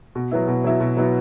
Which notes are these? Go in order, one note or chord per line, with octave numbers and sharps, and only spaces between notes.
B2
F#3 B3 E4
B2
F#3 B3 E4
B2
F#3 B3 E4